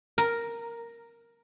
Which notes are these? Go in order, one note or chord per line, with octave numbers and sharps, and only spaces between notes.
A#4